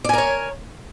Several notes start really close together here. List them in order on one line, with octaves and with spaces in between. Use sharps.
D5 G#5 A#4 C#5